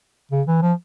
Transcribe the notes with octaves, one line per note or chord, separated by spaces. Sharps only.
C#3
E3
F3